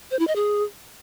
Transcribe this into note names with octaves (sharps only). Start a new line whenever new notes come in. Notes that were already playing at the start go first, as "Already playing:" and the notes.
C5
E4
D#5
G#4